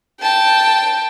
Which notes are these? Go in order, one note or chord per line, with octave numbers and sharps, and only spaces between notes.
G5 A5